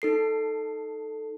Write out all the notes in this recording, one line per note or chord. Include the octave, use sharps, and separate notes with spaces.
D#4 A4 C7